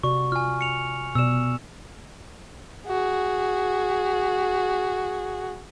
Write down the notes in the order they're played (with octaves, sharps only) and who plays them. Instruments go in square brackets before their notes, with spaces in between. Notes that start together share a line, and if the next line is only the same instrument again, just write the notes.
[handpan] C3 F#4 D5 [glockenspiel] C#6
[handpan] F4 [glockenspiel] G#5 F6
[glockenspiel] C#7 F7
[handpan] B2 D5 [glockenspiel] E6 E7
[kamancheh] F#4 G#4